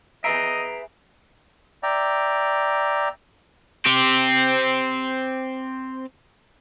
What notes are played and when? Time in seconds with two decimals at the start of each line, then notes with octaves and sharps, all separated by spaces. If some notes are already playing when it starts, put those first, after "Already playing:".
0.24 G#4 B4 D#5 E5 A#5 C7 D7
1.83 D5 E5 G5 A#5
3.86 C4 G4